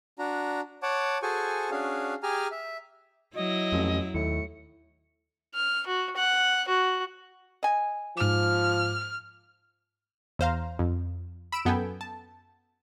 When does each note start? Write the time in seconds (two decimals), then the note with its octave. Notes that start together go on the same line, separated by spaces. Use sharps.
0.19 D4 F#4 A#5
0.83 C#5 F#5 A5 D6
1.22 F#4 G#4 A4 C5 G#5 C#6
1.71 C#4 D4 F#4 G#4 F5
2.23 G4 G#4 G#5 A#5 F6
2.52 E5
3.35 F#3 E4 D#5
3.72 A1 F2
4.14 D#2 A2 C#7
5.54 F6
5.87 F#4
6.16 F#5
6.68 F#4
7.63 D#5 G#5
8.17 G#2 F3 D6 F6
10.39 E2 C5 F5 A#5
10.79 F2
11.52 B5 E6 D7 E7
11.65 F#2 B3 A4 G5 G#5
12.01 A5